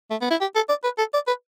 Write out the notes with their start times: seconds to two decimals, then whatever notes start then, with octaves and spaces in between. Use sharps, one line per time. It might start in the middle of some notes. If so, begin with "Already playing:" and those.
0.11 A3
0.21 B3
0.31 E4
0.41 G4
0.55 A4
0.69 D5
0.84 B4
0.98 A4
1.14 D5
1.27 B4